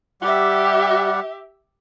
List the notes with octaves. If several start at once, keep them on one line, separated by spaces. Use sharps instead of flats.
G3 G4 E5 F#5